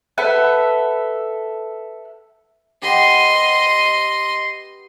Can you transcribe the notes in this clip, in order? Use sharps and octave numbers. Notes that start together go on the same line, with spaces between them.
A4 B4 E5 F#5
G4 B4 D#5 F#5 C6